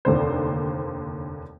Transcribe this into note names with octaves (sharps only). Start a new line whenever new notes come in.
F1 D#2 D3 C5